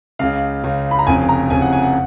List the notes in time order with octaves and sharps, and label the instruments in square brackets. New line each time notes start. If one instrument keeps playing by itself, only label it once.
[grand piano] C#2 C#3 F5
C#2 C#3
B5
A#5
F1 F2 C#3 G#5
A#5
F1 F2 C#3 G#5
F#5
G#5
F#5